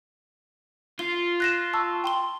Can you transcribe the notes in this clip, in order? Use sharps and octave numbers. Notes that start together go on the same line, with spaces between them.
F4 G7
F#6 A#6 E7
A5 C#6 E6
G5 C6 G7